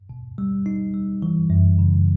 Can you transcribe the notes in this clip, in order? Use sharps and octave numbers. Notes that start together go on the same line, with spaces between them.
B2
G3
D#4
G3
E3
F#2
C#3